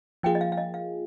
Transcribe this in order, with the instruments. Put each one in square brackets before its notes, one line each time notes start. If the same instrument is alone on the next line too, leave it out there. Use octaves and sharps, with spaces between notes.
[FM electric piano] F3 A#3 F4 G#4 [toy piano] G5
[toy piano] D#5
F5
F5
D#5
F5